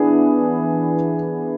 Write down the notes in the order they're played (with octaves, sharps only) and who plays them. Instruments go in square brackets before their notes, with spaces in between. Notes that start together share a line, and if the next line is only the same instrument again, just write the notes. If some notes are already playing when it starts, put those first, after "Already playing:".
Already playing: [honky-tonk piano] E3 B3 D4 [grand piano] G#4